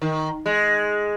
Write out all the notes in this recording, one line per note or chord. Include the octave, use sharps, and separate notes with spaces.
D#3
G#3